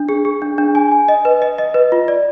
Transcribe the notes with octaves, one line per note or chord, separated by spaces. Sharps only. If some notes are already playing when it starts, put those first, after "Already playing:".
Already playing: D4
G#4
G#4
D4
D4
G#5
G#5
D#5
B4
D#5
D#5
B4
F4
D5